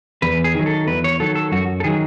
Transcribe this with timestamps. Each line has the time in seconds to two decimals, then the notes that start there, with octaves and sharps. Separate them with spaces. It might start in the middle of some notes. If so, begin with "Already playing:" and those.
0.22 E2 B4
0.44 G#4
0.55 D#3 F#3
0.66 A4
0.87 E2 B4
1.04 C#5
1.20 D#3 F#3 A4
1.35 A4
1.52 F#2 F#4
1.80 A4
1.84 D#3 F#3 G#4